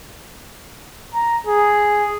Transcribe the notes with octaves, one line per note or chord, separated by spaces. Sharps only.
A#5
G#4